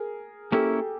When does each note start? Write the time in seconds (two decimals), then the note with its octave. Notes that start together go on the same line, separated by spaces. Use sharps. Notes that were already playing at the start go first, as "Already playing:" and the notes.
Already playing: G#4 A#4
0.52 A#3 C#4 E4 G4 A4